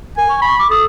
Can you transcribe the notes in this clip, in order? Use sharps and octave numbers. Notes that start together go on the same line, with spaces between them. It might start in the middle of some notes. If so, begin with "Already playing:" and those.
A#4 G#5
C#6
B5 C#6
D6
A4 D#6